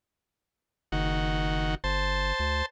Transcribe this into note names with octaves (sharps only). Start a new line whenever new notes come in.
F#1 D#3 F#4
G1 C5 A5
D2